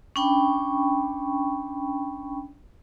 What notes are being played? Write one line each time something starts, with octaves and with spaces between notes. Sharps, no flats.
C#4 D4 G5 B5 C#6